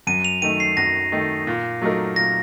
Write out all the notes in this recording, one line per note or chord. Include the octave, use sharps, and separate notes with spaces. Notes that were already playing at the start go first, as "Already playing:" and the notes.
F#2 D#7
F7
D#3 A3 D#4 D#7
C7
F#2 A#6
D#3 A3 D#4
A#2
F#3 A3 D#4 A#4
A#2 A#6